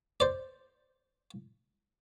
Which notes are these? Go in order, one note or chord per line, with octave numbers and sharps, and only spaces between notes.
C5 D5